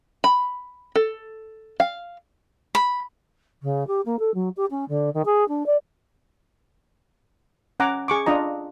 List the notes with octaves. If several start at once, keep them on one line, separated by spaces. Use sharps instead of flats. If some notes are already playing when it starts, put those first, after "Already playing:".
B5
A4
F5
B5
C#3
G4
A#3
A4
F#3
G4
C#4
D3
D#3
G#4
D4
D5
C#4 F#5 G#5 A#5 D6
G#4 C#6 D6
D4 F4 D#5 A#5